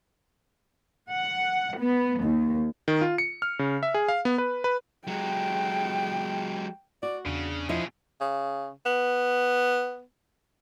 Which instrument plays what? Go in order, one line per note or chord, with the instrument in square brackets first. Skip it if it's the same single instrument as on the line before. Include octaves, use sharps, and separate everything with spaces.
[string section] F#5
B3
D#2
[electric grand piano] D#3
F4
C#7
F6
C#3
E5
G#4
F5
B3
B4
B4
[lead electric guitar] F#3 G#3 [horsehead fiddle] G5
[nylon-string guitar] F#4 [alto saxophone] D5
[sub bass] E2 [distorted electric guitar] C#3 [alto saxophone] D4
[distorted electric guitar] B2 G#4 [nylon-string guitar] F3 E4 D#5
[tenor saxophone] C#3
B3